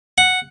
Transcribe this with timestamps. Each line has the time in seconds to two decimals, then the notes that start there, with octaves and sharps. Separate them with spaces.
0.18 F#5